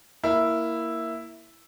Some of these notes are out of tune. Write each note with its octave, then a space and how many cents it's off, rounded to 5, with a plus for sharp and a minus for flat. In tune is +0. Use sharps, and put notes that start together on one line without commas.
A#3 +0 E4 +0